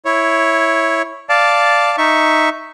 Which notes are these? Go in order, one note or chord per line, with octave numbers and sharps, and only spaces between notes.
E4 C#5
D5 F5 A5
D#4 E5 C#6